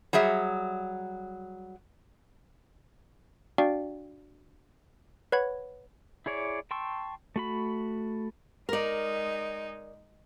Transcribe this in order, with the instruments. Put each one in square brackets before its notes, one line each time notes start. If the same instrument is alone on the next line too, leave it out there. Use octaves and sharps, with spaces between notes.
[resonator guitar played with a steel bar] F#3 G3 G#4 E5
[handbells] D4 F#4 D5 F5 G5
B4 C#5 F#5 B5 G#6
[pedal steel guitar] E4 G#4 C#5 D5
G5 A5 C6 C#6 E6
A3 F#4 B5
[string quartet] G#3 D#4 [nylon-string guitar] A#4 D5